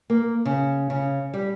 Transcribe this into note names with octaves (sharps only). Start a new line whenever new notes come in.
A#3
C#3
C#3
G3